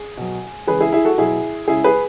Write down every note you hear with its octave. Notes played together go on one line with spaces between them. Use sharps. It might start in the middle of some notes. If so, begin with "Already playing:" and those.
Already playing: G#4
B2 F#3
C#3 E3 G#3 G#4 B4
E4 G#4
E4 G#4
F#4 A4
B2 F#3 E4 G#4
C#3 G#3 E4 G#4
G#4 B4